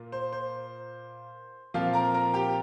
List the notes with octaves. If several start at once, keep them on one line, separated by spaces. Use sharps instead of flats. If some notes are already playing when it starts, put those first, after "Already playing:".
Already playing: A#2 A#3 F4
C5
C5
A#2 F3 C4 F4 F5
A#4 A#5
A#4 A#5
G4 G5